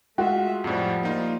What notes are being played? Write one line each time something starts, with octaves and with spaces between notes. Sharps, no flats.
G#3 A3 F4 F#4 E5
F2 A2 F3 G3
A#3 D#4 F4